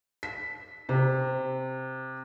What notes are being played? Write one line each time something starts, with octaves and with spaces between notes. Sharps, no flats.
B6
C3